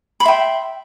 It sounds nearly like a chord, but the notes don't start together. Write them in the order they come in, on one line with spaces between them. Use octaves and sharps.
B5 C6 E5 G5